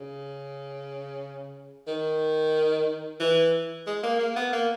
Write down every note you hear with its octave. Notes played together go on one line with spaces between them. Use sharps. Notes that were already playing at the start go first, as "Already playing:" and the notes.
Already playing: C#3
D#3
E3
G#3
A#3
A#3
B3
A#3